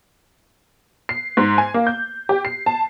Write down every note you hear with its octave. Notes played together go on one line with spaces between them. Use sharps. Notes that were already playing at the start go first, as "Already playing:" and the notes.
C7
G#2
G#5
A#3
G6
G4
C7
A5